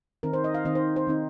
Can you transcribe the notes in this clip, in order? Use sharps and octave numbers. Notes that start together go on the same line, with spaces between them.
D#3 C4 D#4 A#4
C5
D#5
F5
D#3 C4 D#4 D#5
C5
C5
D#3 C4 D#4